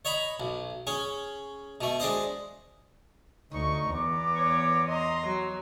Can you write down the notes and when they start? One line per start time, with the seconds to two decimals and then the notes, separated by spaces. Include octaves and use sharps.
0.05 C#5 D#5 A#5 B5
0.40 B1
0.87 C#4 G#4
1.81 B2 A3
2.00 G#3 D4 C5 D#5
3.52 D2 D#4 A#5 C#6
3.94 E2 B3 A#5 D6
4.36 C#5
4.88 D#5 A#5 C6
5.27 F#3